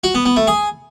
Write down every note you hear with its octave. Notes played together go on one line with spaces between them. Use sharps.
F#4
B3
B3
A3
G#4